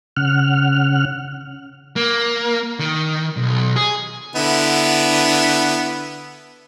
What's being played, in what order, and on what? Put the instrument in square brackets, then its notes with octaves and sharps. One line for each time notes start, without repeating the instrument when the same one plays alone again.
[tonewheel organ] C#3 F#5 F6
[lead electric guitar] A#3
D#3
B1
G#4
[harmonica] D3 B3 E4